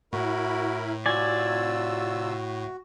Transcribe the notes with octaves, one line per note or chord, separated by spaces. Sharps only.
A2 E4 F#4 A#4 B5
C3 F4 F#4 D5 G#5 E6